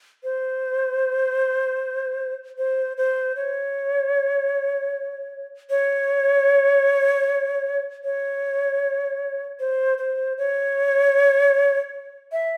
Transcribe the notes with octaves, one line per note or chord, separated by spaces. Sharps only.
C5
C5
C5
C#5
C#5
C#5
C5
C5
C#5
E5